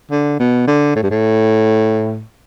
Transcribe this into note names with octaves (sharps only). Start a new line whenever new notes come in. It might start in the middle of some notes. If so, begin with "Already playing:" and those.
D3
B2
D3
A2
G2
A2